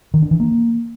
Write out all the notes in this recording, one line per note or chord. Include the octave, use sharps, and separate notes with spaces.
D#3
D4
E3
A#3